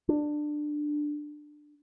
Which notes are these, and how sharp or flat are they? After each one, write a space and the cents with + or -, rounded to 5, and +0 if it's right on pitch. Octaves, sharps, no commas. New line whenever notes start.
D4 +15